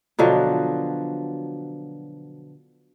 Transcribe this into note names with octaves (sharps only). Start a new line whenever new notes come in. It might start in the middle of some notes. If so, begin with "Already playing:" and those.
B2 D3 F3 F#3